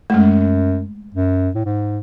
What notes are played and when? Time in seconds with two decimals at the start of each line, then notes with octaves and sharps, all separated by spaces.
0.10 A3
0.14 F#2 G#3
1.15 F#2
1.55 A2
1.65 G#2